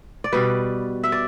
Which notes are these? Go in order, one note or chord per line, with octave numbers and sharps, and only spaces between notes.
D5
B2 G3 B4
E5
D5